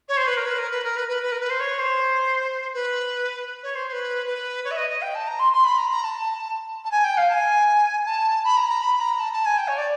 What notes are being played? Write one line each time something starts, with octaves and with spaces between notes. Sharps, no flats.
C#5
C5
B4
A#4
B4
A#4
B4
A#4
B4
B4
B4
A#4
B4
C5
C#5
C5
B4
C#5
C5
C5
B4
B4
C#5
E5
D#5
D#5
G5
A5
A#5
C6
C6
B5
A#5
A#5
A5
A5
G#5
G5
F5
A5
G#5
A5
B5
A#5
A#5
B5
A#5
A5
A5
G#5
G5
C#5
D5